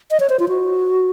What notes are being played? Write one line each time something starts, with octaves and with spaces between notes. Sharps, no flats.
D#5
C#5
C5
F4
F#4